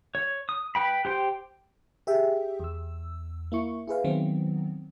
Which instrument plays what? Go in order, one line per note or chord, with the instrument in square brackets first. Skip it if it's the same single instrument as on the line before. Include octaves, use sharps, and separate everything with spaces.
[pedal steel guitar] C#5
D#6
B4 G5 B5
G4 C5 G5
[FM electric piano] G4 G#4 E5 G5
E2 E6
A#3 E4 C#6
E4 G#4 B4 F5
D#3 F#3 B3 C4